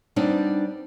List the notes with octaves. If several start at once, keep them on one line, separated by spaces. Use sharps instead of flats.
G3 B3 C4 D4 D#4